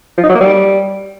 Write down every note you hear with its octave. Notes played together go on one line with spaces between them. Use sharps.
F3
D#4
F#3
A#3
G3